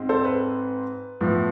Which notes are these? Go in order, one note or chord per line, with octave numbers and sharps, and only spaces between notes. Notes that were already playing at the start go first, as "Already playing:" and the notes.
Already playing: G#2 G#3 C4
A4 C5
B4
A2 F3 B3